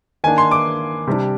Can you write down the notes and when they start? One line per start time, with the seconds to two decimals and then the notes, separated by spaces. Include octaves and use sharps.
0.24 D#3 A#3 D4 G#5
0.38 C6
0.51 D6
1.07 C3 G3 D4